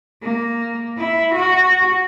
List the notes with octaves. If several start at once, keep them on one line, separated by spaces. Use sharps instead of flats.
A#3
E4
F#4